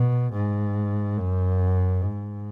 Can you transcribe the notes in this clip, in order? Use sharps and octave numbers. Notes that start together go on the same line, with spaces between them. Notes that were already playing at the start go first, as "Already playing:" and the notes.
Already playing: B2
G#2
F#2
G#2